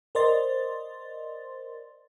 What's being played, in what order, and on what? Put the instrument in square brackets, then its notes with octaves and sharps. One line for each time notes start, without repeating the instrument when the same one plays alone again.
[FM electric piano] A#4 C5 D5 D#5 C6 A6